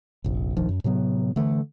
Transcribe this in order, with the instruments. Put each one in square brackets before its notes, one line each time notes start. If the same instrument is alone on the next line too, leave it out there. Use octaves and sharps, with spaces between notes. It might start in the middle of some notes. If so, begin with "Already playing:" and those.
[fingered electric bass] F1 A#1
E1 A#1 D#3 F3
F#2
A2 C3 F#3 B3
D3 E3 A3